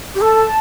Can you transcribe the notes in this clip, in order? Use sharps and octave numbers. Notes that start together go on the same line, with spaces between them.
G4
A4 A5